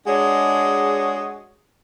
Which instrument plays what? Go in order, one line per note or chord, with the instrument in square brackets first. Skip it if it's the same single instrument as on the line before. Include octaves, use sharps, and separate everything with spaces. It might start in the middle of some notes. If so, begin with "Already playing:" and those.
[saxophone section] G#3 D4 F#4 G#4 C#5 D#5